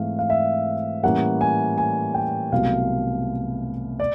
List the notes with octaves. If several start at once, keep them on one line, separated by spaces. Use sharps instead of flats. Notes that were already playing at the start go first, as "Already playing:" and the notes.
Already playing: G#2 E3 A3 C4 F5
F5
E5
A2 E3 G3 A#3 C#4 F#5
G#5
G#5
G5
C2 B2 F#3 A3 F5
D5